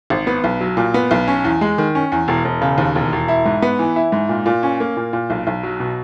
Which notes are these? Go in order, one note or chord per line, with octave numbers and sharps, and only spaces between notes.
G#1
B3
B1
F#3
A#2
B3
B1
C#4
E2
G#3
D#3
C#4
E2
E1
E1
C#3
D#2
E1
E1
E4
G#2
B3
E3
E4
G#2
A#2
A#2
C#4
A#3
A#2
A#2
B1
B1
F#3
B2